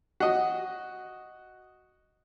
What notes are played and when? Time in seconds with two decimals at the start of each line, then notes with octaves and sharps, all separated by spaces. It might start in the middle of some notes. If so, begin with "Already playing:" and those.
0.20 F#4 D#5